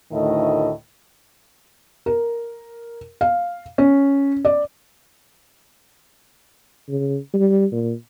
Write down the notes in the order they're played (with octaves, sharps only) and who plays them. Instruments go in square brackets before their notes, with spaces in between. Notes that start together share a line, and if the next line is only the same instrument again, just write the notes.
[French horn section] D2 A2 D#3 D#5
[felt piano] A#4
F5
C#4
D5
[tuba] C#3
G3
A#2